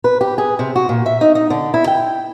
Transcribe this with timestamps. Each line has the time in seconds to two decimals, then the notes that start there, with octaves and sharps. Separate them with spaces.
0.04 B4
0.21 G4
0.38 G#4
0.59 C3
0.76 F#4
0.89 A#2
1.06 E5
1.21 D#4
1.35 D#4
1.50 D3
1.74 E4
1.88 G5